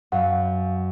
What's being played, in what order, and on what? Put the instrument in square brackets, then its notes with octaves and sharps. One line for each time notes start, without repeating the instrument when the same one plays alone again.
[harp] F#2 [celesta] F5 F#5